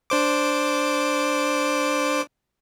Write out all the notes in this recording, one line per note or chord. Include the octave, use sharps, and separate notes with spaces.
D4 C5 D6